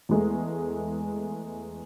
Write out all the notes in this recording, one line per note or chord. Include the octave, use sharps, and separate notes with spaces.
E2 G#3 A3